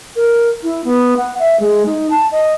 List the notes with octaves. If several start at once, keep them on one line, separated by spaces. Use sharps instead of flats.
A#4
E4
B3
F#5
E5
G#3
D#4
A5
D#5